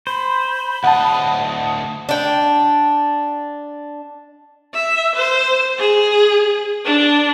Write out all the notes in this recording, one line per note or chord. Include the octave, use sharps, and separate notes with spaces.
C5 B5
D2 D#5 F#5 A5
D4 G5
E5
C5
G#4
D4